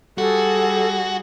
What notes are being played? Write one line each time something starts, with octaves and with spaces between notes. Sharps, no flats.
G3 F#4 G#4 A4